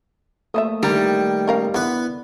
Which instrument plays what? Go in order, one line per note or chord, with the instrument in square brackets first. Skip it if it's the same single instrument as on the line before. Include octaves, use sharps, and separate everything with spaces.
[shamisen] F3 C5 E5 [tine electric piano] A3 A#3 D#6
[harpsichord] D#3 [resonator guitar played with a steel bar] G3 [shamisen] D4 E4 A#4
[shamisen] C#4 A#4 F5
[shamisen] D3 E3 [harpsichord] B3 B4 [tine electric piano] E4